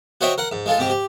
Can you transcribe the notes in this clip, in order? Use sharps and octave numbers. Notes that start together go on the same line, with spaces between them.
F#4 C5 C#5 D#5 E5 G5
A#4 F#5
G#2
G#3 F4 A4
G#2 C4 G4
G4